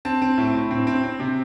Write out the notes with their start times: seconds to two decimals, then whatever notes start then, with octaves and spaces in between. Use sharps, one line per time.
0.05 C4 A5
0.22 C4
0.38 A2
0.54 A2
0.71 C4
0.87 C4
1.04 C4
1.20 C3